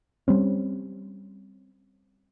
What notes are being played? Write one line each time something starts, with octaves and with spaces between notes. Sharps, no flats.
G3 C4 C#4